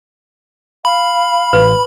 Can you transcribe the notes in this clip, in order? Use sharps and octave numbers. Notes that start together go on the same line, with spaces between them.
F5 B5
A1 B4